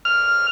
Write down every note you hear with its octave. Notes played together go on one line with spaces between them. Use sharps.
F6